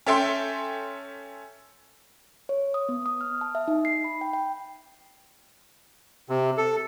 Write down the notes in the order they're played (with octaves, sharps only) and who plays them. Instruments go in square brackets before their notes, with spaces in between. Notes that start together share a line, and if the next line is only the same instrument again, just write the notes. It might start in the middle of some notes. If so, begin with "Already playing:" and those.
[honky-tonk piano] C#4 A4 E5 G5 C6
[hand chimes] C#5
D#6
B3
D#6
F6
A5
E5
D#4
C7
B5
G5
G5
[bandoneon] C3
A4